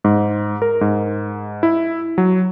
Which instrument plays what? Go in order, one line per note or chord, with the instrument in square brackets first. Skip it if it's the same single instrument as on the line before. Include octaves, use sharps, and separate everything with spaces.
[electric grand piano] G#2
A#4
G#2
E4
F#3